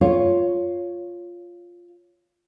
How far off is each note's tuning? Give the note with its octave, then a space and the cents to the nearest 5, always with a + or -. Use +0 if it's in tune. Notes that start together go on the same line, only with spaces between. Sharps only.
F4 +0 C#5 +0